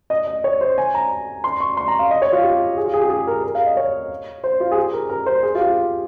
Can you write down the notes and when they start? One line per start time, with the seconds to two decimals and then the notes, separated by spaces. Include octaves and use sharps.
0.10 D#5
0.27 D#5
0.44 C#5
0.61 C5
0.78 G#5
0.94 A#5
1.44 C6
1.60 C#6
1.77 C6
1.88 A#5
1.99 F5
2.11 D#5
2.22 C#5
2.33 F4
2.43 G4
2.77 G#4
2.85 F4
2.94 G#4
3.02 G4
3.10 G#4
3.27 A#4
3.44 A#4
3.55 F5
3.66 D#5
3.77 C#5
4.44 C5
4.60 F4
4.72 G#4
4.77 G4
4.93 A#4
5.09 A#4
5.26 C5
5.43 G#4
5.55 F4
5.60 G4